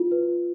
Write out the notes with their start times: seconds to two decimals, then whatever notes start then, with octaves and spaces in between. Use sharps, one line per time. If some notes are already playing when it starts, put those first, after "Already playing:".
Already playing: F4
0.11 B4